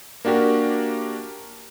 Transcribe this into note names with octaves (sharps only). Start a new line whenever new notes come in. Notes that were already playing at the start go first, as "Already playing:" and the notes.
A#3 D4 F#4 G4 A#4